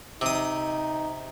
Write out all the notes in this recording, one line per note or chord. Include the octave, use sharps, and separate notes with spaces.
C3 D#4 D#6